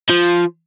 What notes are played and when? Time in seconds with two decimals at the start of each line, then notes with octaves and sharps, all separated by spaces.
0.10 F3